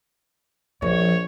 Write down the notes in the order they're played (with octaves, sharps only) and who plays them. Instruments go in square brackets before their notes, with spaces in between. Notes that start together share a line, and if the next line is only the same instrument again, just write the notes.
[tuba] A#1 [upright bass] F3 [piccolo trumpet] C#5